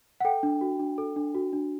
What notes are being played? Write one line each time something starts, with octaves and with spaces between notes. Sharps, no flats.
F#5
A4 G5
D4
F#4
D4
A4
D4
F#4
D4